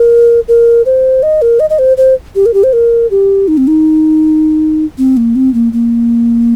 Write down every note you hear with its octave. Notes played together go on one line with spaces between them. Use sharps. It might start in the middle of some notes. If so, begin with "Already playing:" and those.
Already playing: A#4
A#4
C5
D#5
A#4
D#5
D#5
C5
C5
G4
A#4
G4
C5
A#4
G4
D#4
C4
D#4
C4
A#3
C4
A#3
A#3